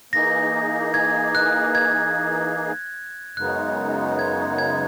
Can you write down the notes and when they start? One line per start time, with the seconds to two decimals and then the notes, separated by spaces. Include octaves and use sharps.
0.12 E3 A#3 D#4 G#4 A#6
0.94 G#6
1.35 F#6
1.75 G#6
3.37 F#2 C#3 G#3 B3 D#4 F#6
4.19 G#6
4.58 G#6